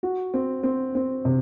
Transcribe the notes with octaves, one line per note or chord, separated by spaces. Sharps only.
F#4
C4
C4
C4
C3